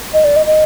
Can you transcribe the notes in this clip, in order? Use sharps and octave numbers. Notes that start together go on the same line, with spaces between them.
D#5
D5
D#5
D#5